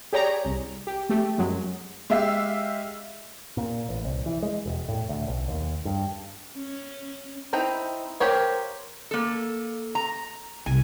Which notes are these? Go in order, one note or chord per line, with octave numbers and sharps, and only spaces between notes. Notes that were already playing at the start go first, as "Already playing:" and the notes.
G4 G#4 C#5 D5 A#5
C2
G4
A3 G4
F#2 F#3 G#3
G#3 G4 E5 F5
A#2
A1
C2
E3
G#3
E1
A2
D2
B1
D#2
G2
C#4
C4 D#4 E4 G5 A#5
G4 A#4 C5 C#5 F5
A#3 A4
A#5
C2 G#5